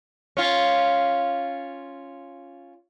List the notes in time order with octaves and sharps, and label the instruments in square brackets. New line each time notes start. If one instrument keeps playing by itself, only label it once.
[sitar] C#4 F4